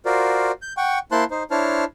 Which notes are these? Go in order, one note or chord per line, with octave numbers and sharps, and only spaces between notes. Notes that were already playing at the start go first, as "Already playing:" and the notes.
F4 F#4 A#4 C5 D5
G6
F#5 G5 C#6
A#3 E4 C5 A5 C6 F#6
D#4 C5
D4 E4 C5 C#5 A5 F6